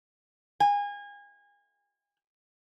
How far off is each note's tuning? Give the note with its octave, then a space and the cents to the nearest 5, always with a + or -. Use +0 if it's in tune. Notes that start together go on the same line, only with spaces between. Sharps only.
G#5 -30